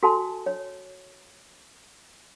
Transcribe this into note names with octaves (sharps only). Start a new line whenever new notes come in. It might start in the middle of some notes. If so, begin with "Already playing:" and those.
F#4 A4 G#5 A5 C6
C#5